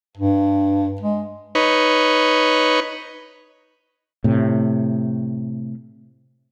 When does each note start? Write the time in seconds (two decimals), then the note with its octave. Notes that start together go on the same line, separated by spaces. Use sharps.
0.17 G2
1.01 G#3
1.55 D#4 B4 C#5
4.24 A2 C3